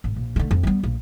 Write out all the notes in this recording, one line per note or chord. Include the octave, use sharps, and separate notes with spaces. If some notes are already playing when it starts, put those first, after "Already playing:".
G#1
A#1
D3 A3
F2
G3 B3
A#1